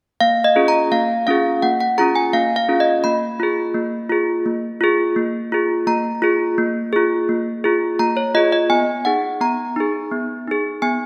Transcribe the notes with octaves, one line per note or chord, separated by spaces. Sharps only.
A#3 F5
D#5
C#4 F4 G#4
A#5
A#3 F5
C#4 F4 G#4 F5
A#3 F#5
F#5
C#4 F4 G#4 A#5
G#5
A#3 F5
F5
C#4 F4 G#4
D#5
A#3 B5
F4 G#4
A#3
F4 G#4
A#3
F4 G#4
A#3
F4 G#4
A#3 A#5
F4 G#4
A#3
F4 G#4
A#3
F4 G#4
A#3 A#5
C#5
F4 G#4 D#5
D#5
B3 G#5
D#4 G#4 F#5
B3 A#5
D#4 G#4
B3
D#4 G#4
B3 G#5